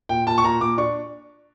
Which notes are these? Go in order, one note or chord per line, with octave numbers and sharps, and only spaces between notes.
A#2 G5
A#2 A5
C#6
A#2 A#5
A#2 D6
D4 C#6